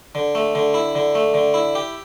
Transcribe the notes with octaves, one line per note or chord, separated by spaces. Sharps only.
D3
A3
D3
E4
D3
A3
D3
E4
G4